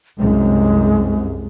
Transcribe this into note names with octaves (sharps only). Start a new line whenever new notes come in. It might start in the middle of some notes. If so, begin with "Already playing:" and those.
C2 F#2 C3 G#3